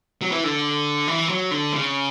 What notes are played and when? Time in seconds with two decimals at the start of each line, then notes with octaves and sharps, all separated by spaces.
0.22 F#3
0.32 E3
0.44 D3
1.08 E3
1.29 F#3
1.51 D3
1.74 C#3